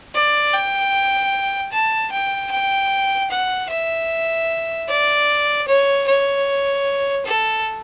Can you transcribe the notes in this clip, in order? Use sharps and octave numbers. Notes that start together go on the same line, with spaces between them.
D5
G5
A5
G5
G5
F#5
E5
D5
C#5
C#5
A4